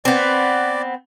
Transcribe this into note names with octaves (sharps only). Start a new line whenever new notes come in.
B3 C4 D5